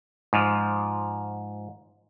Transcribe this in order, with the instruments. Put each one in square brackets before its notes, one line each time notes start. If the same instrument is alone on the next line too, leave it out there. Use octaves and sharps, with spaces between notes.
[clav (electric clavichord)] G#2 F3